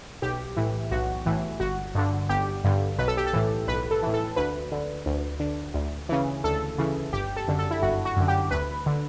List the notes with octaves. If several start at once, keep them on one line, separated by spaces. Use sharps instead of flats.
B1 G4
A2 E3
B1 F#4
A2 E3
G1 F#4
G2 D3
G1 G4
G2 D3
B1 B4
A4
G4
A4
A2 E3
B1 B4
A4
A2 E3
A4
D2 B4
D3
D2
D3
D2
C#3 E3
D2 A4
C#3 E3
G1 G4
A4
F#2 D3
A4
E4
G1 F#4
F#4
F#2 D3
G4
D2 B4
D3